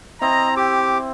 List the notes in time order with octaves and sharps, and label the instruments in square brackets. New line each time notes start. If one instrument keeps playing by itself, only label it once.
[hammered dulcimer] C4 E4 [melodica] D#5 [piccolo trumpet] A#5
[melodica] G4 [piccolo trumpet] D6